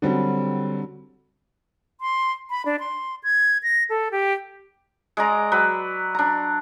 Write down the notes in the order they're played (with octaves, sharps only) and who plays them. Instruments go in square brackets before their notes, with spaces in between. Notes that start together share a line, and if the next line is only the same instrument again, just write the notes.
[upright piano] D3 F#3 G3 C4
[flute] C6
B5
D4
C6
G#6
A#6
A4
G4
[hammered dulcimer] G#3 D5 A#5
F#3 B4
D4 A#5